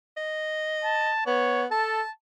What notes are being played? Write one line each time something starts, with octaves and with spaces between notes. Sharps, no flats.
D#5
A5
B3 C#5
A4 A5